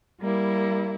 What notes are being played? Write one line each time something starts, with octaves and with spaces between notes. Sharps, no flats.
G3 A#3 E4